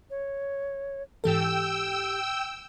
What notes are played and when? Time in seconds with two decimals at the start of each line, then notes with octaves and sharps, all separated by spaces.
0.10 C#5
1.24 G#2 E3 G4 A4 G5 E6